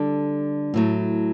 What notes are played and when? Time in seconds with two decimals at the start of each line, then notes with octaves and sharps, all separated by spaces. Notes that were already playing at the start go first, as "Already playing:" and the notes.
Already playing: D3 G3 D4 A4
0.74 A2 F#3 A3